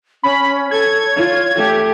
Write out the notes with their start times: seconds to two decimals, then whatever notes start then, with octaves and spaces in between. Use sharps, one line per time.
0.23 C#4 B5
0.71 A4 C#5 G#6
1.17 F4
1.56 A3 G4